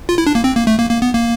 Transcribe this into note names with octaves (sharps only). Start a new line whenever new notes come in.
F4
E4
D4
A#3
C4
A#3
A3
A#3
A#3
B3
A#3